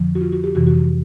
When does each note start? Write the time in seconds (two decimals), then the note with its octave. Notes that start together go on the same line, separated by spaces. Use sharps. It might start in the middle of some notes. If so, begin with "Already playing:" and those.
Already playing: F2 D3 F3
0.15 F#4
0.21 F4
0.33 F#4
0.44 G4
0.55 F2 C3 E3 F#4
0.67 F#4